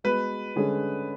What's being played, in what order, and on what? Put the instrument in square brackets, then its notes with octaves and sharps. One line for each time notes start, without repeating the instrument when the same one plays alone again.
[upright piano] G#3 B3 F#4 [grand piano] B4
[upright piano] D3 G#3 C#4 G#4